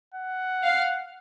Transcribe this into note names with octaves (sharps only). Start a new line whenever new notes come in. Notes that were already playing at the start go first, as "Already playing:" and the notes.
F#5
F5